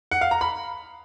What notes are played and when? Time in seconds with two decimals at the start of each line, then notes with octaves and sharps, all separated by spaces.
0.11 F#5
0.21 F5
0.31 A#5
0.41 B5